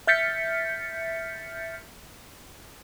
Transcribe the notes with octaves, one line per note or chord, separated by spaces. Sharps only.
E5 F6 G6 A6 B6 C#7